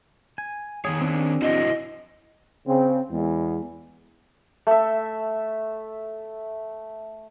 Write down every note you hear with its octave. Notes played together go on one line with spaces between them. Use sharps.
G#5
D#3 E3 G#4 C#5
C4 D4 G#4
E4 F#4 C5 D#5
C#3 C4
E2 G#3
A3 E5